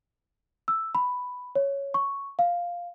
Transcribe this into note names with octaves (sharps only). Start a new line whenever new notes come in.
E6
B5
C#5
C#6
F5